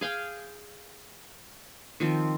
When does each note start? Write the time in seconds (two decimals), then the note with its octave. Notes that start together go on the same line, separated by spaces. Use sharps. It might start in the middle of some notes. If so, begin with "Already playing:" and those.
0.01 G#4 F5 G5 G#5
2.00 D#3 F3 C4